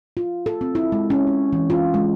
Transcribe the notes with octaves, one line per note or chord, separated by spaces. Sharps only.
F4
A4
C4
E4
G#3
C#4
E4
E3
F4
G#3